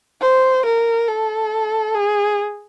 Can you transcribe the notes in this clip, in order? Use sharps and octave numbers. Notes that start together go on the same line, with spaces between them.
C5
A#4
A4
G#4